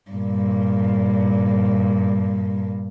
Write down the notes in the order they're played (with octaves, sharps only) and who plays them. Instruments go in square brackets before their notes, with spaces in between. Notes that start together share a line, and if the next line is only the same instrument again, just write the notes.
[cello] G2 A#2